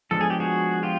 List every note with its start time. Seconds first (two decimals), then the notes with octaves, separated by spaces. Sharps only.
0.11 F3 G#3 B3 D4 A4
0.21 G#4
0.30 G4
0.40 F#4 G#4
0.83 F4 G4